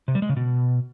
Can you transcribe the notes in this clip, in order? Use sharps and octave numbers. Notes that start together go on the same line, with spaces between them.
C3
G3
G#3
C#3
B2